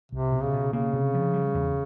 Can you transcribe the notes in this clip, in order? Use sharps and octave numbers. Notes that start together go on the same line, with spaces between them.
C2 C3
B2
C#3
B2
C#3 A#3
C3
F3
G3
E2